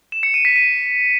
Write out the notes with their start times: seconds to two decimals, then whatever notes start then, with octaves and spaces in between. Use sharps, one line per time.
0.12 E7
0.23 C#7
0.34 D#7
0.45 B6
0.56 D#7